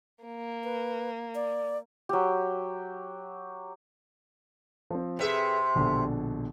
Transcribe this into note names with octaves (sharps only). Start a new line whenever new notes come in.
A#3
B4
D5
F#3 G4
F3 C4
C3 G#4 A4 B4 E5
A#1 B2 D3